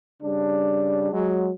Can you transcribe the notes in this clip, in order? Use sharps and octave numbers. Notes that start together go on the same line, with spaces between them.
C#3 G3 D4
F#3 G#3